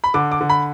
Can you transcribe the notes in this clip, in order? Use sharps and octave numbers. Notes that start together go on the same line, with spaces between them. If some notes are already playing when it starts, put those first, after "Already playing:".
B5
D3 D6
D6
D3
B5